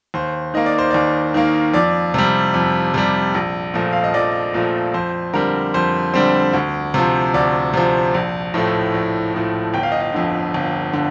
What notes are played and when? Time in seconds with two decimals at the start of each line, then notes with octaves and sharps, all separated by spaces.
0.14 D#2 C5
0.54 D#3 A#3 D#5
0.66 D5
0.79 C5
0.90 D#2 D5
1.34 D#3 A#3
1.74 F2 D5
2.14 C3 G3
2.54 F2
2.94 C3 G3
3.34 A#1
3.74 A#2 F3 A3
3.93 F5
4.04 D#5
4.14 A#1 D5
4.54 A#2 F3 A3
4.94 F2 C5
5.33 D3 G3 C4 A#4
5.74 F2 C5
6.14 D3 G3 C4
6.54 D2
6.94 C3 F3
7.34 D2 D5
7.74 C3 F3
8.14 A#1
8.54 A2 F3 A3
8.94 A#1
9.34 A2 F3 A3
9.74 G1 G5
9.83 F5
9.92 D#5
10.00 F5
10.14 F2 D3
10.54 G1
10.93 D3